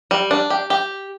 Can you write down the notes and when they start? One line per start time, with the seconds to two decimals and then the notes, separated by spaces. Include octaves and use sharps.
0.11 G3
0.31 D4
0.50 G4
0.70 G4